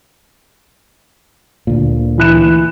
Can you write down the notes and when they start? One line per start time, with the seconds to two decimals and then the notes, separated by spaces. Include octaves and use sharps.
1.67 D2 A#2
2.18 E3 F#6 E7